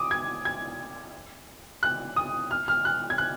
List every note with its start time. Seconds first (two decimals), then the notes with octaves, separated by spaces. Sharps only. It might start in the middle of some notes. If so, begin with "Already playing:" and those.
Already playing: D6 D#6
0.11 G#6
0.45 G#6
1.83 F#6
2.16 D#6
2.51 F6
2.68 F6
2.85 F#6
3.10 G#6
3.18 F#6